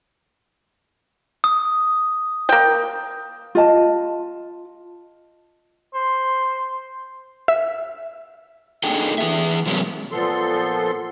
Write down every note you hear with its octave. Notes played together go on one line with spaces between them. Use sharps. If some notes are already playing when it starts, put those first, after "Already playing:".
D#6
A#3 G5
F4 D#5 A5
C5
E5
A#3 D4 D#4 G#4 A4 G5
E3 G#4 E5
C3 F#3 G#3 A#3 B3 C#4
A#2 F3 B3 A4 C6